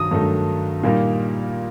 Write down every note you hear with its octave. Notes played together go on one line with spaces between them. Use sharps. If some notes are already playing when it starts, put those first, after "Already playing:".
Already playing: G2 D#3 F#3 D#6
G2 D#3 F#3 A3 D#4
A#2 G3 A#3 D#4